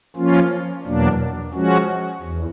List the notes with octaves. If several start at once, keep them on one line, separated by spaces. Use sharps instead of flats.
F3 A#3 C#4 F4
E2 B2 F#3 A#3 D4
F3 G#3 C#4 F#4
E2